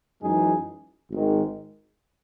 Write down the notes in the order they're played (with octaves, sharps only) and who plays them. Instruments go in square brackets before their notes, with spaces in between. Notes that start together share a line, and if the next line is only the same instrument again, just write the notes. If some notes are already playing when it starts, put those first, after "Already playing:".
[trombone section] F#2 E3 G#3 D#4 G#4
G#1 G#2 D#3 G#3